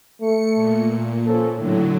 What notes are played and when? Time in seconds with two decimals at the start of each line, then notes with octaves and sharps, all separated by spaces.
0.21 A3 C#7
0.55 A#2
1.26 F3 C#4 A4
1.57 A2 D3 F#3